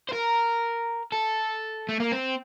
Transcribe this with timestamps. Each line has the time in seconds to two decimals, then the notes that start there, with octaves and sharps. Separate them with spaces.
0.09 C5
0.13 A#4
1.12 A4
1.89 A3
2.00 A#3
2.12 C4